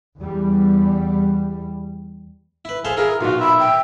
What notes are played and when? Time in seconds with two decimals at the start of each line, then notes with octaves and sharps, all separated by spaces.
0.19 E2 G3
2.65 E4 B4
2.85 G#4 A4 C5 F5
2.97 E4 F4 G#4 A#4
3.21 B1 A#2 F4 F#4
3.40 E5 B5
3.60 G5